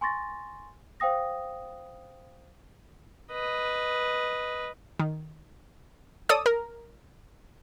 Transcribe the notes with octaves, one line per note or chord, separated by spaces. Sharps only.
G#5 C6 C#6 A6 A#6
C5 F5 G5 D#6 A#6
B4 D#5
D#3
A4 C#5 D5 D#6 E6
A#4